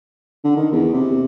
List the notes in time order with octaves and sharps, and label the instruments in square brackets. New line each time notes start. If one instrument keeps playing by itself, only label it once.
[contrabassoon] D3
D#3
E2
C3